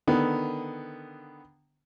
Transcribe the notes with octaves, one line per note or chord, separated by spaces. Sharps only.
D3 D#3 B3